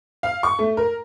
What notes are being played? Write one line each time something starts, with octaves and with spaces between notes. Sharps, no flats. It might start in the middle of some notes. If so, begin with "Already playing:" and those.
F5
C#6
A3
A#4